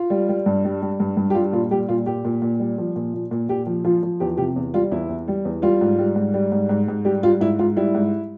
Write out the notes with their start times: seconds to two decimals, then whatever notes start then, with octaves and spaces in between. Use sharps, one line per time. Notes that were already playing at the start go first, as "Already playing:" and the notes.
Already playing: F4
0.10 G3
0.29 G3
0.46 G2
0.64 G3
0.82 G3
1.00 G2
1.17 G2
1.30 G4
1.35 G3 F4
1.53 A#2 F4
1.71 G3 G4
1.89 A#2 F4
2.06 A#2 G4
2.25 A#2
2.42 A#2
2.60 G3
2.78 F3
2.96 A#2
3.14 A#2
3.31 A#2
3.49 A#2 G4
3.67 F3
3.84 F3 F4
4.03 F3
4.20 E2 G4
4.37 C3 G4
4.56 E2
4.74 G3 F4
4.91 E2 E4
5.09 E2
5.28 G3
5.45 E2
5.62 G3 F4
5.81 G#2
5.99 G3
6.16 G#2
6.34 G3
6.52 G#2
6.69 G#2
6.88 G#2
7.05 G3 G4
7.23 G3 F4
7.40 G#2 E4
7.59 G#2 F4
7.76 G3 E4
7.94 G#2